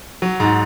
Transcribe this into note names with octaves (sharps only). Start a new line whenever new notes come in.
F#3
G#2